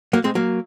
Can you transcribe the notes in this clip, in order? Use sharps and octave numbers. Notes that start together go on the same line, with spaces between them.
F#3 A#3
G#3 C4
F#3 A#3